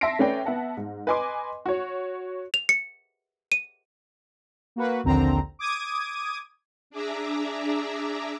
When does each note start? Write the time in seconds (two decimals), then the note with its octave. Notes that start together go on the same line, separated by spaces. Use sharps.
0.01 E5 A5 C6 A#6 C7 D7
0.19 A3 C#4 B4 D5 G5
0.46 B3 E5 F#5 A5
0.77 G#2
1.07 B4 D#5 G#5 C6 D6
1.66 F#4 C#5
2.54 F7
2.69 C#7
3.52 D#7
4.76 A#3 F#4 B4
5.04 A#1 D#2 D3 C4 A#5
5.59 D6 D#6 G#6 D#7
6.90 D4 G#4 D5 E5 A#5